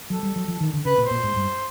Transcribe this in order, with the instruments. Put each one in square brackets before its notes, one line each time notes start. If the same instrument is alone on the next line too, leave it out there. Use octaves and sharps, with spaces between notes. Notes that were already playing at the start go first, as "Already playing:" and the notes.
[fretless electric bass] F#3 [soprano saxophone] A4
[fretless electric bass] G3
F#3
F3
D#3
D3
[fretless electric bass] C#3 [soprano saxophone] B4
[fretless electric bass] A#2
[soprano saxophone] C5
[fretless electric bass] A#2
G#2
G2